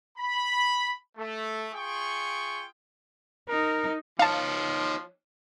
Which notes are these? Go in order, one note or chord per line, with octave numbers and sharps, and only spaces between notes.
B5
A3
F4 G#4 G5 C#6
D#4 A#4
F3 D#4 C#5 F5 A5